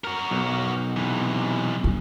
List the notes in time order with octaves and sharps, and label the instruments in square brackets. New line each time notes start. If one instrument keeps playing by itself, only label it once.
[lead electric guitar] F#4 A#4
[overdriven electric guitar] B1
[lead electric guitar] C3 E3
[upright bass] D4